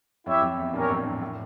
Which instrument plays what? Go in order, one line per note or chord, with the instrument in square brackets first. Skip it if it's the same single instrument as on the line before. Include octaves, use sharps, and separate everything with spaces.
[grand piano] F2 [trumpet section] E4 G4 C#5 E5
[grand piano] F2
E2
[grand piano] G2 A#2 [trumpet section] C#4 G4 A#4 C#5
[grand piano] F2 A2
E2 G2
A2